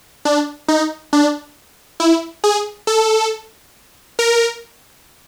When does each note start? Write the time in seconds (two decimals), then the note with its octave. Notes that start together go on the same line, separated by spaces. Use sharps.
0.25 D4
0.68 D#4
1.13 D4
2.00 E4
2.44 G#4
2.87 A4
4.19 A#4